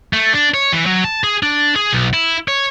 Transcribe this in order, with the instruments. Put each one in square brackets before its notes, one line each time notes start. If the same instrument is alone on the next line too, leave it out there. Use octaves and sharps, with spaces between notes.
[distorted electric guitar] A3
D4
C#5
E3
F#3
A5
G#4
D4
G#4
B1
E4
C#5